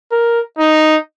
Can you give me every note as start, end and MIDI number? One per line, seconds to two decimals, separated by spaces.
0.12 0.41 70
0.59 0.96 63